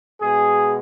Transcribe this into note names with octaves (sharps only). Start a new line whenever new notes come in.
B2 G#3 G#4